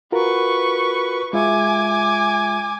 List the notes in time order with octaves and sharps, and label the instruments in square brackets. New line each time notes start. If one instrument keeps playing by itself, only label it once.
[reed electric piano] F4 F#4 A#4 [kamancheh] B4 C#6
[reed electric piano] G#3 F4 E5 [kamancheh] G#5 D6